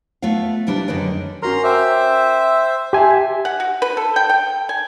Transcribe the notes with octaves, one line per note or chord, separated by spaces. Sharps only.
A3 B3 F4 F5
C3 G3 D4 E4 B4
F#2 D3 D#3 G#4 B4 D5
C#4 F#4 A#4 A#5 C6
C5 E5 G5 D6
G4 E5 G#5 A5 C6
F#5
F#4
B4
A4
G5
G5
G#5